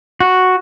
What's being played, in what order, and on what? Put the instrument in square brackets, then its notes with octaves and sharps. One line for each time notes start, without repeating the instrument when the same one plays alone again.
[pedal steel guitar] F#4